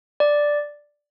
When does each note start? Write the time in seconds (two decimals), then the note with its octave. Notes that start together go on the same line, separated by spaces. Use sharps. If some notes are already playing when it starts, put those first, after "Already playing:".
0.20 D5